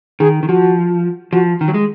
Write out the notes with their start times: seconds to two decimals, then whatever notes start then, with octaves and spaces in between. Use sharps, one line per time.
0.20 D#3 G#4
0.43 D#3
0.49 F3 F#4
1.32 F3 F#4
1.61 D#3
1.68 F#3
1.74 G#3